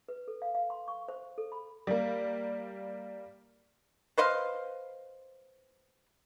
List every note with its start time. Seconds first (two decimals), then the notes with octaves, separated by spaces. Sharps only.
0.09 B4
0.28 A4
0.42 F5
0.55 F5
0.70 C6
0.88 C#6
1.08 C5
1.38 A4
1.52 B5
1.87 G3 A#3
4.18 B4 C5 D#5 F5